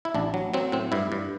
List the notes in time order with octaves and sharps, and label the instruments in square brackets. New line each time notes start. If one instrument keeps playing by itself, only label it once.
[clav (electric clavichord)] E4
A1 D4
F#3
F#3 C4
A2 C4
G2 E4
G2